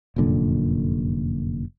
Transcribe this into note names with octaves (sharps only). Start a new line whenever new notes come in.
F1 F#2 A#2 D3